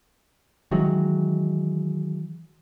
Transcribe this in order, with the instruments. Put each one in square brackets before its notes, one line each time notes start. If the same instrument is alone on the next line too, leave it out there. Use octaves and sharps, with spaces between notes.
[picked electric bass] D#3 E3 F#3 G#3